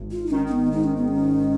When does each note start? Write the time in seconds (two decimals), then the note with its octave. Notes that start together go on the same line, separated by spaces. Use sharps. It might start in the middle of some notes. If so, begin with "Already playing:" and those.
Already playing: G#1
0.11 F4
0.26 D#4
0.31 D#3 C#4
0.47 C#4
0.52 B3
0.71 G#2 D#4
0.84 C#4
0.96 B3
1.08 G#1 C#4